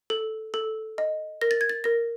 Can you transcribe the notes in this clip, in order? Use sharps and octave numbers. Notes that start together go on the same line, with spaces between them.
A4
A4
D#5
A#4 A#6
A6
G#6
A6
A#4 A#6